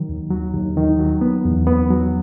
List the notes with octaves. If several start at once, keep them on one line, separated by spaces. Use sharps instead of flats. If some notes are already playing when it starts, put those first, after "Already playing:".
Already playing: D#3 F#3
D#2
F#3
D#2
D#3
F#3
B3
E2
B3
F#3